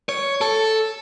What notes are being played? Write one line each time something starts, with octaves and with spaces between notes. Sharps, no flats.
C#5
A4